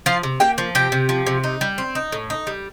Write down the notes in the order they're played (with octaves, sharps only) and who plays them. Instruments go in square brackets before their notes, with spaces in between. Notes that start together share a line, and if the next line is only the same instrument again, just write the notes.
[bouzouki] F3 F4 F5
C3
A#3 G4 G5
F3
C3 G4 G5
C3
F3
C3
D#4
G3
C4
D#4
A2
D#4
G3